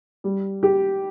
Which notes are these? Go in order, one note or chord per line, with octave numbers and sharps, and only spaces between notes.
G3
G4